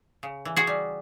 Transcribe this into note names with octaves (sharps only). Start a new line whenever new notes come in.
C#3
E3
F#4 G#4
G3